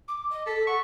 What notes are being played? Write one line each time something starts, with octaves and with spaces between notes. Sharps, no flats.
D6
D#5
A4 B6
F#5 C#6